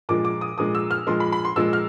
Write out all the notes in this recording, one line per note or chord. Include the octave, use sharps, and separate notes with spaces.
A#2 F3 G#3 D6
D6
D#6
A#2 F3 G#3 D#6
E6
F6
A#2 F3 G#3 C6
B5
B5
C6
A#2 F3 G#3 E6
F6